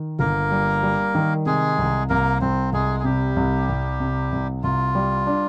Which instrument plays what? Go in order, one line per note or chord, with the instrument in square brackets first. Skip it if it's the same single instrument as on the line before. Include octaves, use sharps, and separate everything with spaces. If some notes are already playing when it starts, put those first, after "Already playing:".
Already playing: [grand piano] D#3
[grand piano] G1 [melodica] A#3 A#4
[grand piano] G3
G3
D#3
[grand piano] C3 [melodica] G#3 G#4
[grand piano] C2
[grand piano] C2 [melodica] A#3 A#4
[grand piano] C2 [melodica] C4 C5
[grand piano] C2 [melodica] G#3 G#4
[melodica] G#4
[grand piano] C3 [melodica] G3 G4
[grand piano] C2
C2
C3
C2
[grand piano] C2 [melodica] F4
[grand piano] G3
D4